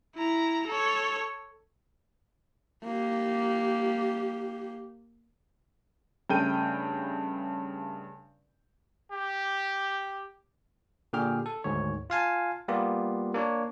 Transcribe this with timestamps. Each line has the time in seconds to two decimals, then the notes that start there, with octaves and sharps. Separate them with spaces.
0.15 E4 A#5
0.67 A4 C#5
2.84 A#3 G4
6.30 G2 C#3 A3 G5 G6 D#7
9.12 G4
11.13 A#2 D3 G4 G#4 G5 F6
11.46 A4
11.64 D2 G#2 D#3 C#5
12.10 F4 F5 G#5 A5
12.68 G3 A#3 B3 F4 G4
13.34 A#3 D4 C#5